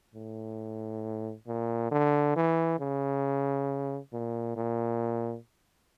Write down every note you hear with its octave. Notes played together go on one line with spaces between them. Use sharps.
A2
A#2
D3
E3
C#3
A#2
A#2